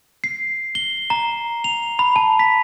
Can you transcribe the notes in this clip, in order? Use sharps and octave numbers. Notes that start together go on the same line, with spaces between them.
C7
G7
A#5
F7
B5
A5
B6